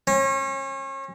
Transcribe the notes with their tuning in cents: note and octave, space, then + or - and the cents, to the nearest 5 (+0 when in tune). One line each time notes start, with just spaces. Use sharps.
C#4 -35